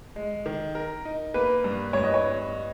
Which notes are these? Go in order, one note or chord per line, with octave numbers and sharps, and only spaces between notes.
G#3
D#3
A#4
D#4
A#3 B4
G2
G2 C#5
D#5
C#5